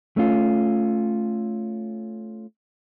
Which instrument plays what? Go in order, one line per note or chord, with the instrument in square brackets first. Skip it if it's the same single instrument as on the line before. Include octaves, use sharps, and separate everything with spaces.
[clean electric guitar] A3 C#4 F4